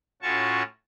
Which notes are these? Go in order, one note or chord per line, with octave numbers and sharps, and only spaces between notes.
A2 C#4 F4 F#4 A5 C#6